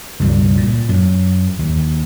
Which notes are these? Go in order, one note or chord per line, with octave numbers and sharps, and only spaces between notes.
C#2 G2 B2 G3
A#2
F#2
D#2